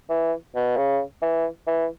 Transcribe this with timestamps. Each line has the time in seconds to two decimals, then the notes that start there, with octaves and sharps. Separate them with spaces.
0.09 E3
0.55 B2
0.77 C#3
1.22 E3
1.67 E3